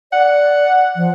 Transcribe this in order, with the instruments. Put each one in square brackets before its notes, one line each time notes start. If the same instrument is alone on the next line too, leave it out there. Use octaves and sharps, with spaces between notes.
[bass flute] D5 [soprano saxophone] F#5
[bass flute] F3